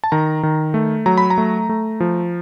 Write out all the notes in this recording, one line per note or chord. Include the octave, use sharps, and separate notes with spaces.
A5
D#3 A#5
D#3
A3
F#3 A#5
B5
A#5
A3
A3
F3